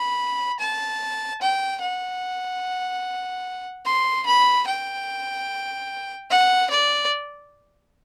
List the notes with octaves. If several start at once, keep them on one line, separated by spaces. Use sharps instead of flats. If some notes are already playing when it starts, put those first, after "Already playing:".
Already playing: B5
A5
G5
F#5
C6
B5
G5
F#5
D5